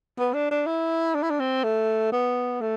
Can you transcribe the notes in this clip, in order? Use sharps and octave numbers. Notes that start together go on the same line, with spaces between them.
B3
D4
D4
E4
D4
E4
D4
C4
A3
B3
A3